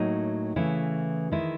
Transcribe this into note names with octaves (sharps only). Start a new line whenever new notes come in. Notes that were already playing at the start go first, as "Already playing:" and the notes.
Already playing: A2 F#3 A#3 D#4
C#3 E3 A3 E4
D#3 G#3 E4